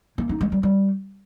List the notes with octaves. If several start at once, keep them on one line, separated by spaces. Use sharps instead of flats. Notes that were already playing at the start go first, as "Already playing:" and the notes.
A#3
D#4
G#3
G3
G3